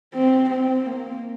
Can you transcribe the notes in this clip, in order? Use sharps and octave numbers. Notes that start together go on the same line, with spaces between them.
C4
C4
A#3